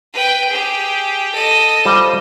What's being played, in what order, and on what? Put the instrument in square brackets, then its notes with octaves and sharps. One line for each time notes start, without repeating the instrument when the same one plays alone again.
[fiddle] B4 G5
G4 G#4
A4 D#5
[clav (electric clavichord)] G3 F4 C5